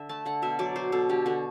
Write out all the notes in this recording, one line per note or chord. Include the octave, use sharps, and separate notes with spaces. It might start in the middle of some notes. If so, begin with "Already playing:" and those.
Already playing: D3 E5
A3 A5
D3 F#5
B2 E5
F#3 D5
B2 C5
B2 A4
D3 G4
D3 F#4